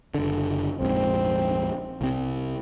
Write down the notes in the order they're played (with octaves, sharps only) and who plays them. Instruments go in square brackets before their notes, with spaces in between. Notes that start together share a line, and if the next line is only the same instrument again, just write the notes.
[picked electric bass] F#1 D3
[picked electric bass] A#1 F2 G#2 [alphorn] C4
[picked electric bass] C2 C4